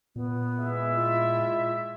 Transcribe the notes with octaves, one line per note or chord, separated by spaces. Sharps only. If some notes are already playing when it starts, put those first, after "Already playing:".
A#2 B3
G#3 E4 E5
F4